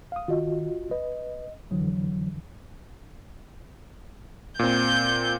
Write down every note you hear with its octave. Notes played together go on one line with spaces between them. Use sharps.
F5 D#6
D#3 F4 F#4 D#5
B4 D#5
F2 D3 E3 F#3
A#2 C4 G6